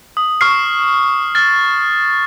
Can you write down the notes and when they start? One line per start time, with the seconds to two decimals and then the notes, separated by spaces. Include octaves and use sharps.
0.17 D#6
0.41 C#6 F6 C7
1.35 F6 A6